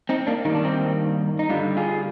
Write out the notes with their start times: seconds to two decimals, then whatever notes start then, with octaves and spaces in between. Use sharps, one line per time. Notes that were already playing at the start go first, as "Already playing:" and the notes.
0.09 C4 D#4
0.27 A#3 D4
0.45 G2 D#3 G3 A#3 D#4
0.55 D4
0.64 C4 D#4
1.39 D#4
1.49 G2 D3 G3 D4 F4
1.77 F4 G#4